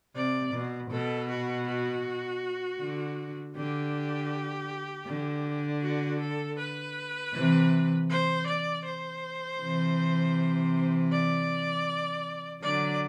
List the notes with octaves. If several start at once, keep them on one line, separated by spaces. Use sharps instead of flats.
C3 D5
B2
B2 A4
F#4
F#4
D3
D3 G4
D3
F#4
A4
B4
C3 E3
C5
D5
C5
C3 E3
D5
D3 F#3 D5